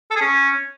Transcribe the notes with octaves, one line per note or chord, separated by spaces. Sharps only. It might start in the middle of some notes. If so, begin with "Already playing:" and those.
A4
G#4
C#4